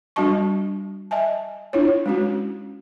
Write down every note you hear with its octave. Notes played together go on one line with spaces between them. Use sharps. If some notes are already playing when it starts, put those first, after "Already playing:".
G3 D4 F#4 D#5 A5 C#6
D#5 E5 G#5 A5
D4 E4 F4 C#5
G#3 C#4 F#4